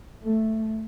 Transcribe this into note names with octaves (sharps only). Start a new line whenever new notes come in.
A3